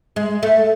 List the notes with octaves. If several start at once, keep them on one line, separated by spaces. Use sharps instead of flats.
G#3
A3